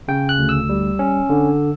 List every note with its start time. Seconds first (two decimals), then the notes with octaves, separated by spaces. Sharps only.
0.08 C#3 G5
0.29 F#6
0.38 D2
0.49 E6
0.69 G3
0.99 C#4
1.30 D3